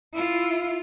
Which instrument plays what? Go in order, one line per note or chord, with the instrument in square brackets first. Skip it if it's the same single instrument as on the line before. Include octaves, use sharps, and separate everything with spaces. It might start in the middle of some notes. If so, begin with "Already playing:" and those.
[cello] E4 F4